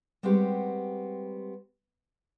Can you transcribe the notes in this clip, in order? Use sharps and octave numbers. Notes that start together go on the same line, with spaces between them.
G3 G#3 B3 C4 F#4 G4